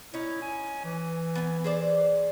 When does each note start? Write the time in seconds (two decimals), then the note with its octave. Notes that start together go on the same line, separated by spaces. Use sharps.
0.14 C#4 D#4 E4
0.42 G#5
0.84 E3
1.35 B3 G#5
1.64 G#4 C5 D5